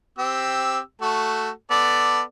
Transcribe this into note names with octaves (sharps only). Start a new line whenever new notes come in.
C4 G4 E6
A3 F#4 A4
B3 A4 D5